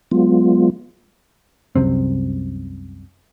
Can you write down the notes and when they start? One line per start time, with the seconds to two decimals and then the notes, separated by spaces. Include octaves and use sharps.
0.11 F#3 G#3 B3 F4
1.76 C2 F#2 C3 C4